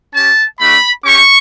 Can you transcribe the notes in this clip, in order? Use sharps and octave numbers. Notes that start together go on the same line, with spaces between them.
C#4 G4 A5
A3 D4 F#4 B5
C#4 G4 C#6